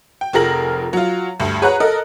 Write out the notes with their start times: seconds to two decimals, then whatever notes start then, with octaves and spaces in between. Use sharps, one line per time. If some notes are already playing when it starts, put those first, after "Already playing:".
0.21 G5
0.33 F1 F3 G#4 A#4 A#6 F#7
0.93 F#3 F4
1.40 D2 G2
1.62 G#4 B4 C#5 F#5 A#5 F#6
1.80 A4 A#4 D#5